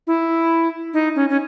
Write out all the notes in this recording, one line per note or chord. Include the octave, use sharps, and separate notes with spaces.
E4
D#4
C#4
C#4